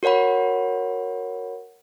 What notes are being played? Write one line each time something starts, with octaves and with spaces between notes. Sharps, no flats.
F#4 A#4 C#5 F#5 B5